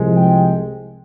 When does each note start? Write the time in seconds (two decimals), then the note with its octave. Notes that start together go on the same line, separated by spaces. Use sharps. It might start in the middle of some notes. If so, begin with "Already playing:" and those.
Already playing: C2 C3 F3 G#3
0.15 G5